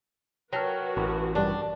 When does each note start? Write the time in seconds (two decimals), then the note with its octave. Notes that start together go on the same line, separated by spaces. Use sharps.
0.53 F#3 F#4 A#4 B4 G5 A5 F6
0.97 A1
1.35 G2 G3 D4